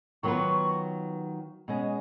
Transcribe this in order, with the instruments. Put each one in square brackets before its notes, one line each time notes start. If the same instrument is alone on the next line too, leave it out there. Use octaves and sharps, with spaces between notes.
[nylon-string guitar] D#3 F#3 B3 F4 B4 [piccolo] C#6
[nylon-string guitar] B2 G#3 C#4 G#4